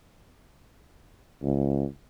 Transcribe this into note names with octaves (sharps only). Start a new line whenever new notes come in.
C#2